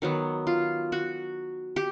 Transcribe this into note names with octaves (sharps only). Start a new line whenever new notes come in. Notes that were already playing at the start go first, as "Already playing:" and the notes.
D#3 F#3 B3
F4
F#4
G4